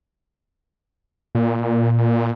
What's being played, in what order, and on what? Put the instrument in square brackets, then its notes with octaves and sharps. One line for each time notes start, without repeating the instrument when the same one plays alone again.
[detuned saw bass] A#2